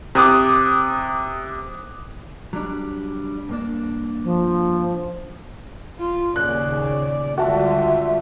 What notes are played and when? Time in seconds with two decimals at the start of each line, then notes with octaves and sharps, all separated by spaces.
0.15 C3 D6 D#6 F#6
2.53 F#3 G3 D4
3.49 G2 A#3 D4
4.24 F3
5.98 F4
6.36 D#2 A#2 C#3 D5 F#6
7.38 C#2 D3 G3 F4 F#4 E5 A5